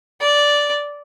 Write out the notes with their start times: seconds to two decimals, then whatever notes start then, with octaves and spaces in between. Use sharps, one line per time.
0.21 D5